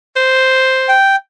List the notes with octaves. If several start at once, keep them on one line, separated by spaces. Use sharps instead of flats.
C5
G5